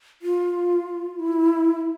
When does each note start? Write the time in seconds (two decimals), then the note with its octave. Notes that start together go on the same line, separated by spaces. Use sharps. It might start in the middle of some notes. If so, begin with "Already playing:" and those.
0.22 F4
1.19 E4